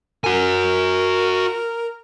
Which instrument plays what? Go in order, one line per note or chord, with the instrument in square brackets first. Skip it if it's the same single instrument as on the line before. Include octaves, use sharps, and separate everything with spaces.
[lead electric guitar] F#4 G#5 [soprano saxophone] A#4